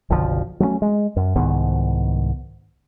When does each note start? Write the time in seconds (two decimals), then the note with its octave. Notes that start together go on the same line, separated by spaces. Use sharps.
0.10 F#1 B1 D3 F3
0.60 F#3 A3 B3 C#4
0.82 G#3
1.16 F#2
1.36 C2 G#2 D#3 B3